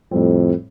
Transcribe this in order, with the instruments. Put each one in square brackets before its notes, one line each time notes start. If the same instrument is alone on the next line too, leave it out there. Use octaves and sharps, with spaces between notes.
[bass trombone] F2 [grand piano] A2 G3 C4